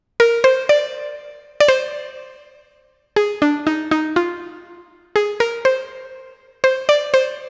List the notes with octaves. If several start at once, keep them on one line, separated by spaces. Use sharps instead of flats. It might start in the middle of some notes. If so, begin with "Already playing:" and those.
A#4
C5
D5
D5
C5
G#4
D4
D#4
D#4
F4
G#4
A#4
C5
C5
D5
C5